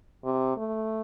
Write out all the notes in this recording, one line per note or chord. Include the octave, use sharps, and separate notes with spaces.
C3
A3